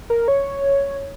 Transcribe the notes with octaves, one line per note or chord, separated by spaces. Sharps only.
A#4
C#5